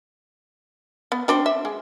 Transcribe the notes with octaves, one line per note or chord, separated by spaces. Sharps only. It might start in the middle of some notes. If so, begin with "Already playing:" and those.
B3
C4 D4 F#4
E5
G#3